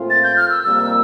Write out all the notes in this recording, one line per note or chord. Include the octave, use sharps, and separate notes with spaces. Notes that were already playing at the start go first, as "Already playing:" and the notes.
Already playing: A#2 A3 C4 F4
A6
G6
F6
E6
F2 C3 G3 A#3 E6